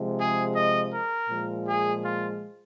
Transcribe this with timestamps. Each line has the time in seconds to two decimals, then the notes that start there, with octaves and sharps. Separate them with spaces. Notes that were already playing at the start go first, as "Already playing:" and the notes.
Already playing: C3 F3 G#3
0.18 G#4
0.55 D#5
0.93 A#4
1.29 A#2 F3 G#3
1.66 G#4
2.04 F4